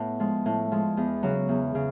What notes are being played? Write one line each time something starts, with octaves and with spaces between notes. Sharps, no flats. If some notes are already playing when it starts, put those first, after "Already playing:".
Already playing: A2 B3
F3 G#3
A2
F3 G#3
E2
C#3 F#3
E2
C#3